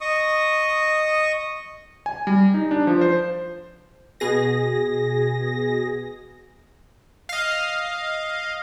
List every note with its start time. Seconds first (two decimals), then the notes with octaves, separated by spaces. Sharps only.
0.01 D#5 C#6 D#6
2.06 G#5
2.27 G3
2.54 D#4
2.71 D4
2.87 F3
3.01 C5
4.20 B2 G#4 A#6
7.29 D#5 F5